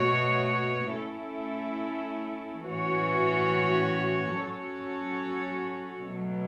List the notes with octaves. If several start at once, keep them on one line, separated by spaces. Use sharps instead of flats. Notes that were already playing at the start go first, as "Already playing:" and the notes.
Already playing: B2 A3 F#4 C#5
A3 C#4 E4 A4
A2 E3 C#4 F#4 C#5
F#3 C#4 F#4 A4 C#5
B2 F#3 A3